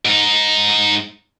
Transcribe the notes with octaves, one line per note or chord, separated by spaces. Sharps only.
G#2 D#4